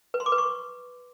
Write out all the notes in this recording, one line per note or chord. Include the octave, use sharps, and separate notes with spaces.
B4
C6
D6
B4
C#6